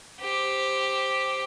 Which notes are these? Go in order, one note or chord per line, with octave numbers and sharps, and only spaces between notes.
G4 C5